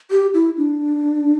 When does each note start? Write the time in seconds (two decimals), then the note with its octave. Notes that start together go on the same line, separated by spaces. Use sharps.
0.11 G4
0.34 E4
0.57 D4